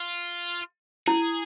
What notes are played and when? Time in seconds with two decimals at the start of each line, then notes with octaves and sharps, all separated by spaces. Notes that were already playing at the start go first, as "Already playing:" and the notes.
Already playing: F4
1.07 E4 G#4